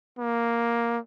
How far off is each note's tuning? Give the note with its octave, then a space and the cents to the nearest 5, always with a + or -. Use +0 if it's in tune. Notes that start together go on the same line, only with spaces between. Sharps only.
A#3 +5